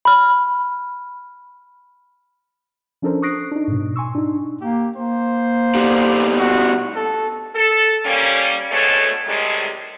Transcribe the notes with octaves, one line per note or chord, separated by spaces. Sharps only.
B5 F6
F3 C#4 D4 A4 A#4 C5
C#6 D#6 F#6 A#6 C7 D7
D4 D#4
G#2 B2
G#5 C6 C#6 E6
D4 D#4
A#3 G4
A#3 C5
B2 G3
F#4
A4
A4
G3 A#3 C#4
D2 B2 G#3 A3 A4 C#5
A2 C3 D#3 G3 G#3